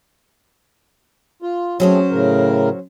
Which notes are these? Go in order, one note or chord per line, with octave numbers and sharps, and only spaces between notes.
F4
F#3 A3 C4 C#4 G#4 C5
A2 C#3 A#4